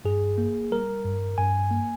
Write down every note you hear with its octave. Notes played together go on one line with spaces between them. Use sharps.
G2 G#4
A#3
G3 A#4
G2
G2 G#5
A#3